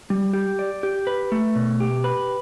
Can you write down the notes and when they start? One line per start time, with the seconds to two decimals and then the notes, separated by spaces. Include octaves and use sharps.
0.10 G3
0.33 G4
0.59 D5
0.83 G4
1.07 B4
1.32 A3
1.55 B2
1.80 G4
2.04 B4